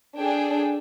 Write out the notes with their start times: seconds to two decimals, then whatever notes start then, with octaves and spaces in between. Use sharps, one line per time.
0.18 D4 G#4 A4 G5